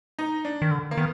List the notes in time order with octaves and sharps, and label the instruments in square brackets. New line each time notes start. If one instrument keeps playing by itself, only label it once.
[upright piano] D#4
D4
[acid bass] D#3
D3
[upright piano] A#3
[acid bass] D#3 [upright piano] B3